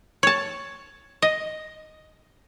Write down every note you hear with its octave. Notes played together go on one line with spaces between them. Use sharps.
C#5 A5
D#5